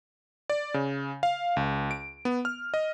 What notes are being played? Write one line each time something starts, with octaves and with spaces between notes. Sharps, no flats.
D5
C#3
F5
C#2
D7
B3
F6
D#5